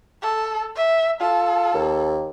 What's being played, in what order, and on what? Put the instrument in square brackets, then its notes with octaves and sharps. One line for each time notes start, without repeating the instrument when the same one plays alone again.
[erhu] A4
E5
[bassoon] F4 [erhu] A4
[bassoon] D#2